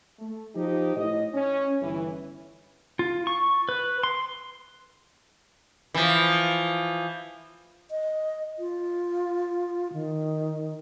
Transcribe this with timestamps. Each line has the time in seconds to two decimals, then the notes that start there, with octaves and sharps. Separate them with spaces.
0.19 A3
0.55 F3 D#4 G4
0.96 A2 D#5
1.34 C#4
1.81 G1 E3
2.99 F4
3.27 C#6
3.69 B4
4.03 C6
5.94 E3 F3
7.91 D#5
8.59 F4
9.93 D#3